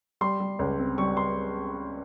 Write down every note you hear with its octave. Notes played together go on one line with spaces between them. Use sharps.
G3 C6
G3
C#2
C4
G3 C#6
C6